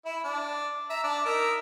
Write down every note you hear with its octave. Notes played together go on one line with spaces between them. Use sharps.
E4 E5
D4
E5 A#5
D4 D6
D#4 A#4 E5